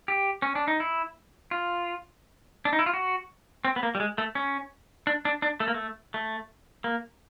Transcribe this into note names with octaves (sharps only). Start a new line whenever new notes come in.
G4
C#4
D4
D#4
E4
F4
D4
D#4
E4
F4
F#4
C4
B3
A#3
G3
G#3
A3
C#4
D4
D4
D4
A3
A#3
A3
A3
A#3